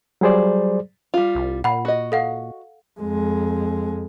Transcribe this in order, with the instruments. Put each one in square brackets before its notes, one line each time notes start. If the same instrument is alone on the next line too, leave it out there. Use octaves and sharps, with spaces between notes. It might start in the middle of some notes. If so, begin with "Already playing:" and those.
[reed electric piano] F#3 G3 G#4 C5 D5
[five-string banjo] G3 F4
[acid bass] C2
[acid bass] A#2 [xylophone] F#5 B5
[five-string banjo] F#4 D#5
[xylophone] A4 F5 F#5
[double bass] F2 G#3